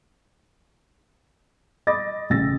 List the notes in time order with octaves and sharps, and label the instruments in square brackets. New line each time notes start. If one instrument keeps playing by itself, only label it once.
[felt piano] D#5 B5 D6 D#6 A6 A#6
A1 C#3 E6 A6 A#6